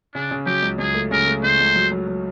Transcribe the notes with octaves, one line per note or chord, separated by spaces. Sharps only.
C#3 D4
C#3
F#3 G4
C#2
C#2 G#4
A3
C#3 A#4
A3
C#2 C5
C#2
F#3
F#3
F#3